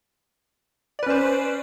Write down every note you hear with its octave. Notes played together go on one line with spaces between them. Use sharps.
C#4 B4 C5 D5